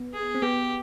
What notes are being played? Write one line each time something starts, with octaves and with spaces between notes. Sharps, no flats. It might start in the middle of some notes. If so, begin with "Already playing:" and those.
Already playing: B3
G#4
C4
B3 G4